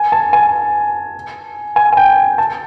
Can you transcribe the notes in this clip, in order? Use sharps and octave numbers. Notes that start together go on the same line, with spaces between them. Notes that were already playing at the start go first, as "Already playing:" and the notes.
Already playing: G#5
A5
G#5
G#5
G#5
G5
A5